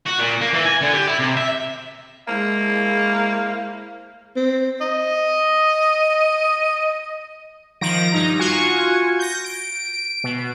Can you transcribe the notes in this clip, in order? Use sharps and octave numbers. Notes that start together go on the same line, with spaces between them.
F#4
A#2
A#3
E3
G#5
D3
G4
E4
C3
E5
G#3 A#3 E4 C5 F5
C4
D#5
D#3 F3 A#6 D7
G2 D#4 A#5
F4 F#4 G#5 C#6
G6 A#6
D7
B2